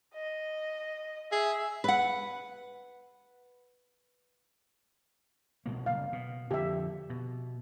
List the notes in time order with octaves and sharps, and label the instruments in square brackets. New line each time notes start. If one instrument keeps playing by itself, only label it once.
[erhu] D#5
[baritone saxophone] G#4 [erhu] E5
[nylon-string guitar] B4 F#5
[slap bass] C2 B2 A#3
[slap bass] F#1 [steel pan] F5
[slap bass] B2
[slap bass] F2 D3 F3 [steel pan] G4 E5
[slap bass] B2